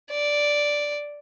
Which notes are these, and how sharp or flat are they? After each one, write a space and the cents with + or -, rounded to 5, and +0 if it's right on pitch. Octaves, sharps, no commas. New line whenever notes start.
D5 +0